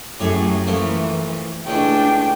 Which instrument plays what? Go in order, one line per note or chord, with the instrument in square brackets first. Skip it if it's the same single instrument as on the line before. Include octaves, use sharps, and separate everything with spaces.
[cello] F#2 F#3 [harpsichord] A2 G4 G#4
[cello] E3 [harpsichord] F3 A3 A#3
[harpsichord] C#2 A2 G#3 [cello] D4 [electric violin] G5